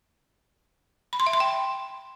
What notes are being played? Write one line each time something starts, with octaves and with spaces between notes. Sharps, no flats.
B5
C6
E5
C6
G5